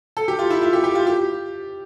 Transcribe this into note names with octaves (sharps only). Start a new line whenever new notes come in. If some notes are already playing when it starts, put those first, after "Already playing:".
A4
G4
F4
E4
F4
G4
G4
F4
G4